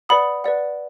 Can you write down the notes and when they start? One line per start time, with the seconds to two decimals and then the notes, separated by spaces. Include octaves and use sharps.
0.09 B4 D5 F#5 B5 D#6
0.44 B4 D5 F#5